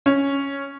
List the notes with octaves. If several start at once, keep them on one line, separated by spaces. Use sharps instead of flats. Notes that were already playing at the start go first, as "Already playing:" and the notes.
C#4